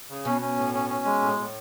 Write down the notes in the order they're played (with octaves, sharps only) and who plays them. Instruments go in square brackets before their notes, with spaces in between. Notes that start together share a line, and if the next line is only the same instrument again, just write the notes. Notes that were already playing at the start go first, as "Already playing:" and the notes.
[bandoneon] C#3
[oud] B2 [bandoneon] C#4
[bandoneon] C#4
A2
C#4
C#4
G#3
A2
A2